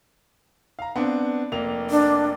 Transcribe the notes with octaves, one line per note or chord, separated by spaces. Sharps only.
F5 A#5
B3 C4 D4
F1 A#3 F7
D4